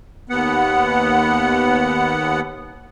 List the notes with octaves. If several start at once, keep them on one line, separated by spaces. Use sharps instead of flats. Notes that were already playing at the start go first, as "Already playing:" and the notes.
D#2 B3 F#5